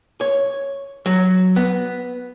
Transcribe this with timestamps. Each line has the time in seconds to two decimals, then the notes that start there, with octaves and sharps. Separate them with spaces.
0.21 C#5
1.06 F#3
1.56 B3